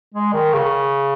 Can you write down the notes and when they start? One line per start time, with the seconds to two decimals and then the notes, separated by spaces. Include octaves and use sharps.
0.14 G#3
0.33 D#3
0.53 C#3